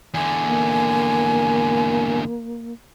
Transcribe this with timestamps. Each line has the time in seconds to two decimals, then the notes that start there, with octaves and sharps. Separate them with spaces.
0.14 E2 D3 G#5
0.45 A#3